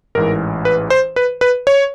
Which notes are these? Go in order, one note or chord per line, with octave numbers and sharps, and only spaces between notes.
A1 G#2 E3 A#4
B4
C5
B4
B4
C#5